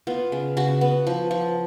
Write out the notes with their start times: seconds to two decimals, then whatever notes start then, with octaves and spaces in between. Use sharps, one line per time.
0.07 B3 F4
0.32 C#3
0.57 C#3 F#4
0.81 B3
1.07 F3
1.31 F3